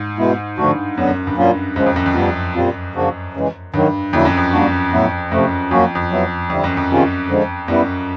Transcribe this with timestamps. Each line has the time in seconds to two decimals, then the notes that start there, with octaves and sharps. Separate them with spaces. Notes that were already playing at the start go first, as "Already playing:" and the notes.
Already playing: G#2
0.18 B2 G#3 B3 E4
0.58 G2 D3 F3 A3 D4 F#4
0.97 F#2 D3 F#3 B3
1.07 F#2
1.27 G2
1.37 A#2 F#3 A#3 C#4 F4
1.76 F#2 C#3 F3 G#3
1.86 F2
1.96 F#2
2.06 F2
2.15 F#2 G3 B3 D4 F4
2.55 A#2 G3 C4 F4
2.94 C#3 F3 A#3 D4 F#4
3.34 C#3 E3 G#3
3.74 G2 D#3 F#3 A#3
4.13 F2 D3 F#3 A#3 C#4 E4
4.25 F#2
4.37 F2
4.52 G3 A#3 D4 F#4
4.93 A2 F#3 B3 E4
5.32 F#2 C3 F3 A3
5.71 F2 F#3 A#3 C#4 F#4
5.95 F2
6.11 F#3 B3 E4
6.49 F2 D3 G3 C4 E4
6.64 F#2
6.77 F2
6.89 C3 D#3 G#3 C#4 F4
7.28 D3 F3 G#3
7.68 F#2 G3 B3 E4